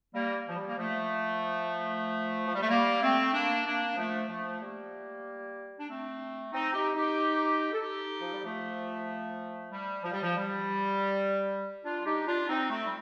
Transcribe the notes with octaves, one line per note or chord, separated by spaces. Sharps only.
G3 A#3
F3
G3
A#3
F3 A3
F3
G3
A3
G3 A#3
A3 C4
A#3 D4
A#3 D4
F3 A3
F3 A3
G3 A#3
D4
A3 C4
C4 D#4
D#4 G4
D#4 G4
A4
D#4 G4
F3
G3
F3 A3
G3
F3
G3
F3
G3
D4 F4
D#4 G4
D4 F4
C4 D#4
A3 C4
G3